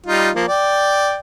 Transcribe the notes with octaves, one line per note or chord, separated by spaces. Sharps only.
G3 D#4 F4
F3 A#3
D5 G5